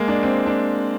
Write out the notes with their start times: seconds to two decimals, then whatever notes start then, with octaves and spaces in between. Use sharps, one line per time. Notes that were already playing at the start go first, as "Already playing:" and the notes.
Already playing: G#3 A#3
0.08 D4
0.23 C4
0.46 D4